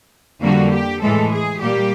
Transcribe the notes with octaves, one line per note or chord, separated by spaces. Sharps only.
F2 D3 G3 A#3 F#4
G4
A2 E3 G#3 A4
G#4
A#2 G3 A#3 G4